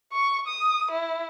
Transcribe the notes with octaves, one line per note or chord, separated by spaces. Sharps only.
C#6
D#6
E4